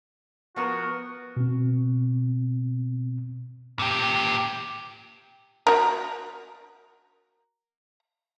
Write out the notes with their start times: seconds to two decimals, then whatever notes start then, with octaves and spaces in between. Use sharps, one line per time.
0.56 F3 B3 F#4 A#4
1.37 B2 C4
3.79 A#2 G4
5.67 F#4 A#4